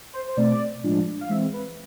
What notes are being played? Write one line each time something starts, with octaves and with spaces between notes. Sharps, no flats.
C5
C5
B2 A3 C4 D5
A2 F3 G#3 D4
F5
E3 G#3 C4 E5
B4